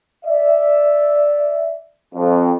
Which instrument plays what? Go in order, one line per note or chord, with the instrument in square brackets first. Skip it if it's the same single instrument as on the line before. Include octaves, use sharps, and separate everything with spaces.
[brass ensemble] D5 E5
F2